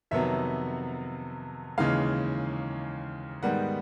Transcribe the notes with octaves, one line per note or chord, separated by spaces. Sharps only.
F2 C3 D#3 F#3 B3 E5
D#2 C#3 E3 G#3 F5
G#2 D#3 G3 B3 F#5